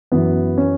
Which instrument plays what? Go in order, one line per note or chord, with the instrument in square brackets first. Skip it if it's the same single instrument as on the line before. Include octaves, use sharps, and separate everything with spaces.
[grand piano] F#2 E3 B3
C#4